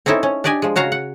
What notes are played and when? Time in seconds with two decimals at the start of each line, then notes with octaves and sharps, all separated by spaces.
0.06 C4 C#4 D#4 E4 A4
0.23 C#4
0.44 D4 G4 D5 D#5 G#5
0.62 F3 G#3
0.76 C#3 F#4 F5 A#5
0.92 F#5